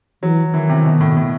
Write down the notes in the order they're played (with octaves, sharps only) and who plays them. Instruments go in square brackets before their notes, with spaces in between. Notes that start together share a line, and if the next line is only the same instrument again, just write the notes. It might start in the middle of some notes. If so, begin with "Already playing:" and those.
[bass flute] E3 [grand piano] F#3
[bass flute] D#3 [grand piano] E3
[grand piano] C3
B2
A2
A2